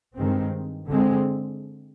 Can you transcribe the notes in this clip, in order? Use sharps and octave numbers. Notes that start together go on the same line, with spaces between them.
G2 D#3 G#3 C4
D3 G#3 C4